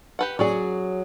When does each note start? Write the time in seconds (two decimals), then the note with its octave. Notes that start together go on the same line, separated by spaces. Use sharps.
0.19 G4 B4 F#5
0.39 F#3 C#4 G#4 D5